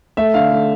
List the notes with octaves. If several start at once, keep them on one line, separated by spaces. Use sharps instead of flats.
A3 E5
D3 F5
A3